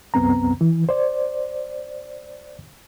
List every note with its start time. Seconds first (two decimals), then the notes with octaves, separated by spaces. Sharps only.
0.14 C2 F#2 B3 C4 A#5
0.61 E3
0.89 C5 D5